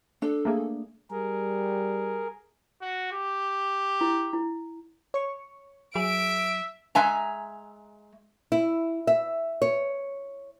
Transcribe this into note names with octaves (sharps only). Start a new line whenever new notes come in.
D4 A4
A3 A#3 G#4
G3 G#4 A#4
F#4
G4
E4
E4
C#5 C#6
F#3 G#4 E5 D7
G#3 E5 G#5 A#5
E4
E5
C#5